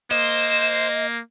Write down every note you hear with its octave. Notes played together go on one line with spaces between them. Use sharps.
A#3 C5 D#5